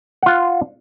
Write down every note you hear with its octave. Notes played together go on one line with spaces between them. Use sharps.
F4 F#5